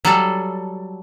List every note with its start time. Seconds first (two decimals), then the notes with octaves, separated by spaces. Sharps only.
0.05 F#3 G3 A4